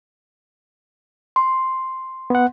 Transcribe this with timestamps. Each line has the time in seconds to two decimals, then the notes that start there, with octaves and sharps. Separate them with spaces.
1.36 C6
2.30 B3 F#5